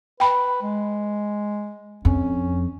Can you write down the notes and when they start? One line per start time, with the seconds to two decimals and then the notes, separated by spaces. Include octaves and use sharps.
0.20 B4 G5 B5
0.62 G#3
2.05 F2 C#4